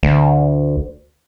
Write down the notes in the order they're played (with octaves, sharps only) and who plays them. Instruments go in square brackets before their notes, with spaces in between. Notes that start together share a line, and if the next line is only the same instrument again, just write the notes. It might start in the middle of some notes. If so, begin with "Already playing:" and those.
[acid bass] D2